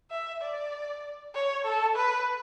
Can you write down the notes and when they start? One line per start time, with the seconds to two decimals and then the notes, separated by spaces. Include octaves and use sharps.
0.11 E5
0.42 D5
1.35 C#5
1.65 A4
1.96 B4